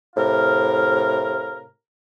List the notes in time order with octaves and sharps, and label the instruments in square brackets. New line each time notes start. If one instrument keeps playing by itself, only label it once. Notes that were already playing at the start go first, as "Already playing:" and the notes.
[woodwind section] A2 C3 A#4 F5